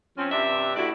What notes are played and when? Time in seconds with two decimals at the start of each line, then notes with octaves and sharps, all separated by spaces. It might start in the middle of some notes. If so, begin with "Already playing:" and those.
0.16 F3 C4 C#4
0.31 G2 C3 D4 E5
0.76 D2 A2 E4 F#4 D5